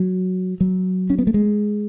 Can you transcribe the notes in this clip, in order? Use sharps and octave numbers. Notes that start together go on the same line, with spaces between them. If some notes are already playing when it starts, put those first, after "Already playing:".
Already playing: F#3
F#3
C#4
B3
A3
G#3